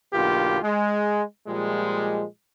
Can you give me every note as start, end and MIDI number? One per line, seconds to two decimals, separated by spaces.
0.13 0.58 35
0.13 0.58 50
0.13 0.58 58
0.13 0.58 65
0.13 0.58 67
0.63 1.22 56
1.47 2.24 46
1.47 2.24 53
1.47 2.24 55
1.47 2.24 56